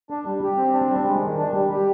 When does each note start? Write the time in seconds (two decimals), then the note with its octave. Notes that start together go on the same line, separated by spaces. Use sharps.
0.10 D4
0.25 G3
0.42 G4
0.57 C4
0.74 D4
0.90 G3
1.05 G#3
1.21 D#3
1.37 D4
1.54 G3
1.70 G4